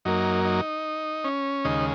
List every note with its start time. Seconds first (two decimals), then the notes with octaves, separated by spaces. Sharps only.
0.05 F#2 F#3 A#3 D#4
0.45 D#4
1.24 C#4
1.65 D#2 C#3 G#3 D#4